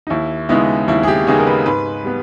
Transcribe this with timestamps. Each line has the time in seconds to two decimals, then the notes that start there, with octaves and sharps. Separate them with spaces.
0.07 D#4
0.10 D#2 E4
0.49 C#3 G#3 B3 D#4 E4
0.88 D#2 E4
1.03 G#4
1.08 G4
1.27 C#3 G#3 B3 D#4 G#4
1.38 A#4
1.47 B4
1.66 G#2 B4
2.04 G3 B3